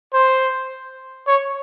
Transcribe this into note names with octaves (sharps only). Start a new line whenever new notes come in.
C5
C#5